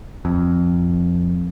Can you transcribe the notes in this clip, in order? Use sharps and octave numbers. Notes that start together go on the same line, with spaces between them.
F2